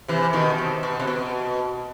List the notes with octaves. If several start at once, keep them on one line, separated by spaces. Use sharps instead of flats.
C3 E3
B2 D#3
C3
B2
C3
B2